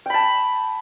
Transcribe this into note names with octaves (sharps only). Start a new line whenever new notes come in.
G5 A5 B5